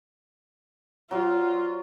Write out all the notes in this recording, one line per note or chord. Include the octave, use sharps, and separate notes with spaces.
F#3 F4 C5 D5